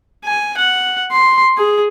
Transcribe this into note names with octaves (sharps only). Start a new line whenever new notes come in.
G#5
F#5
C6
G#4